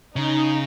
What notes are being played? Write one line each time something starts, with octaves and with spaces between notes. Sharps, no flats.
C#3 D#4